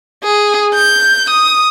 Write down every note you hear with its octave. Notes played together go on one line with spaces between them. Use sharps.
G#4
G6
D#6